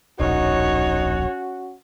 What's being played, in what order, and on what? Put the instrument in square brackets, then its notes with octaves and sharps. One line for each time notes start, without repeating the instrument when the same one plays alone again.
[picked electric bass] D1 A#1 [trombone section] C#4 F#4 [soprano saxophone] D#4 [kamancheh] C#5